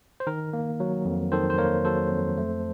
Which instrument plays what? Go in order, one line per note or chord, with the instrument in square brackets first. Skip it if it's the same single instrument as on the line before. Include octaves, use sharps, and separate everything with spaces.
[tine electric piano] C5
D#3 A#4
A#3
F#3
F2
D#3 A4 C5
C5
A#3 A#4 C#5
F#3 A4 C5
F2
A3